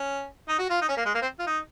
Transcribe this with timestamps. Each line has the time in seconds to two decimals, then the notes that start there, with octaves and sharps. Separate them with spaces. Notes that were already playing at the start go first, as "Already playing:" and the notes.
Already playing: C#4
0.48 D#4
0.59 F#4
0.70 F4
0.82 D#4
0.89 C#4
0.97 A#3
1.05 G#3
1.15 A#3
1.22 C4
1.39 F4
1.47 D#4